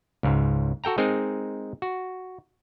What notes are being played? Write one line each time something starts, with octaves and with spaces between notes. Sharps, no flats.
C#2 G#2
F#4 A4 G5 A#5
G#3 C4 D#4 G#4 A#4
F#4